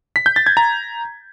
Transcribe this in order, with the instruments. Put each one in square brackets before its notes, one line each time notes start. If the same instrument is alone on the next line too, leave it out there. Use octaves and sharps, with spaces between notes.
[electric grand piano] B6
G6
A6
G#6
A#5